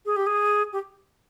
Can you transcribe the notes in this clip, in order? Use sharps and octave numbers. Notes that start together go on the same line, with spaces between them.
G#4
G4
G#4
G4